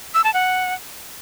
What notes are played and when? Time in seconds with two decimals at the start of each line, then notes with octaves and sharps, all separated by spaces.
0.14 E6
0.24 A5
0.34 F#5